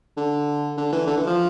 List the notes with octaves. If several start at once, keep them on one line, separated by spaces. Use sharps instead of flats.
D3
D3
E3
D3
E3
F3